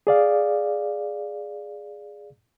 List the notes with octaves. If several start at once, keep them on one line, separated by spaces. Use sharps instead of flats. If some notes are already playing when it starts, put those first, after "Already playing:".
G#4 D5 F5